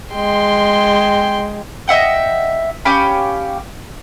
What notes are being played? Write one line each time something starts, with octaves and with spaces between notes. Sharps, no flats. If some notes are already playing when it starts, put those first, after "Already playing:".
G#3 G5 C6
D#5 E5 F#5 G5
C#4 G4 F5 B5